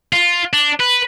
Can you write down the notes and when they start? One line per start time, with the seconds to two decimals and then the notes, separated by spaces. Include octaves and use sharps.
0.13 F4
0.53 D4
0.80 B4